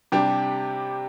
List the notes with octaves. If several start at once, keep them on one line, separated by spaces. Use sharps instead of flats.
C3 G3 D4 G4